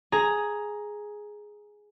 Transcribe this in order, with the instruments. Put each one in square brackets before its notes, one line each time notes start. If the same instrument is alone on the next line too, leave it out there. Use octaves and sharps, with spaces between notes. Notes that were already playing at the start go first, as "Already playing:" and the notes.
[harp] G#4 A#5